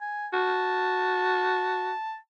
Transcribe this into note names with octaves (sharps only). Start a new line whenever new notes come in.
G#5
F#4 A5